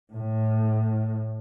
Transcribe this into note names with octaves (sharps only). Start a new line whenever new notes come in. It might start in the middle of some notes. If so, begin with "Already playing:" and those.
A2